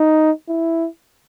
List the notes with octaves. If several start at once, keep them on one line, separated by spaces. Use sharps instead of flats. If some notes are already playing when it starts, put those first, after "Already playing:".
Already playing: D#4
E4